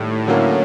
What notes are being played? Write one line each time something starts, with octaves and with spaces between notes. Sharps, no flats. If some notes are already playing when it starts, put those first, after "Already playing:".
Already playing: A2 D#3 G3 A#3
D3 F#3 A#3 C#4